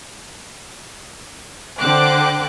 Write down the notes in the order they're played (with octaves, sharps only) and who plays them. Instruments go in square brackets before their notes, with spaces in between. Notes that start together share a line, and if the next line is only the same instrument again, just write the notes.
[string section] D3 C5 G5 D6 F#6